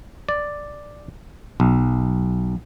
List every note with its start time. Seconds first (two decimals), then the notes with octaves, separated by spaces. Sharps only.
0.29 D5
1.60 B1